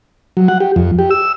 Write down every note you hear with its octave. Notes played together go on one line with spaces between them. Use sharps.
F#3
F#5
G4
F2
G4
E6